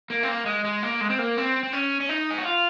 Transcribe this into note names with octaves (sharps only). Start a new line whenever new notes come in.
A#3
C4
A#3
G#3
G#3
A#3
G#3
C4
A#3
C4
C4
C#4
C#4
D#4
G#4
F#4
F4